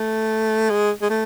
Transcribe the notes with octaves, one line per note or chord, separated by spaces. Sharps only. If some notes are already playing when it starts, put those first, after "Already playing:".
Already playing: A3
G#3
G#3
A3